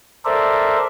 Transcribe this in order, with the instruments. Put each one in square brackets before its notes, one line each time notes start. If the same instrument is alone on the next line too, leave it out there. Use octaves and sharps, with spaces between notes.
[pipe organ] A4 A#4 C5 D5 E5